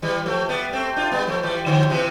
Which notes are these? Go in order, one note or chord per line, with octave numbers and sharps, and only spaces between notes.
E3 G3
F3 A3
G3 B3
A3 C4
D4 F4
G3 B3
F3 A3
E3 G3
D3 F3
C3 E3